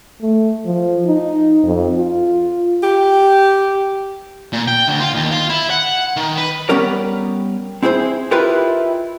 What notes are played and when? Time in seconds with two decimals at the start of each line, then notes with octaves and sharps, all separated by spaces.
0.21 A3
0.65 F3
1.06 D#4
1.63 F2
1.98 F4
2.83 G4
4.53 A#2
4.68 G5
4.88 D2
5.00 F4
5.14 D#2
5.32 F4
5.50 E4
5.71 F#5
6.17 D#3
6.37 B4
6.69 G3 B3 C#4 A#4 D5
7.83 C4 E4 G#4 A4 C5
8.31 E4 F4 G4 A#4 B4 D#5